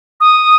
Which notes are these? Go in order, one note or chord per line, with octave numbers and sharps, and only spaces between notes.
D#6